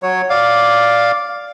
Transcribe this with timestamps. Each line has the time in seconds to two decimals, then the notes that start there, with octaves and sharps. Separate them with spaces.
0.03 F#3 C#5
0.30 D5 F5